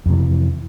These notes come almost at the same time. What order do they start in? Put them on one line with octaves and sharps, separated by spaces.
F2 C3 E3